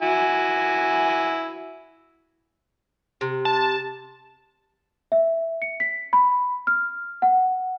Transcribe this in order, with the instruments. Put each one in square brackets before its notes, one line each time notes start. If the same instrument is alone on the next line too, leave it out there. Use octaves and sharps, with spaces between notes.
[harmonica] E4 F#4 G#5
[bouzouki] C3
[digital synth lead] A5
[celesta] E5
C#7
B6
B5
F6
F#5